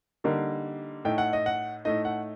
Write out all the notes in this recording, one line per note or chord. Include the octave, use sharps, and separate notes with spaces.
D3 G3 A#3 D#4
A2 A3 D#4 G5
F#5
D#5
F#5
A2 A3 D#4 D#5
F#5